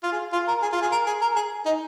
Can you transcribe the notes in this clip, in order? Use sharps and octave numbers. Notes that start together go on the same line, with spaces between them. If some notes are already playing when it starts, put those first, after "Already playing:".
F4
G#4
F4
A#4
G#4
F4
G#4
A#4
G#4
A#4
G#4
D#4